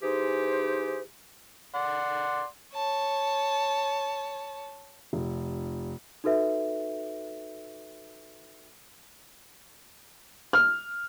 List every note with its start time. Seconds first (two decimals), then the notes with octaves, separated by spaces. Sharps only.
0.03 E3 D#4 G4 G#4 C5
1.74 D5 F#5 C6
2.74 C#5 A5
5.13 F1
6.24 D#4 F#4 A4 B4 E5
10.53 F6